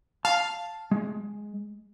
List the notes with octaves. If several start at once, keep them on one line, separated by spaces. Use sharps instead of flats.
F5 A5
G#3